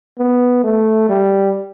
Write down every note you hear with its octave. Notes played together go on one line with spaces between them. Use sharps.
B3
A3
G3